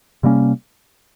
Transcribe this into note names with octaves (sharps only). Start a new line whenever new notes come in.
C3 G3 A#3 C#4